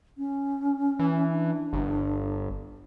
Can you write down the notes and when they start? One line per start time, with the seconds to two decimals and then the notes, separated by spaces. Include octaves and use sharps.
0.18 C#4
0.99 E3
1.30 D4
1.73 G1